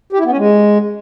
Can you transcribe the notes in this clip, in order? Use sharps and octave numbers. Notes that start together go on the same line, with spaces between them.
G4
E4
B3
C#4
G#3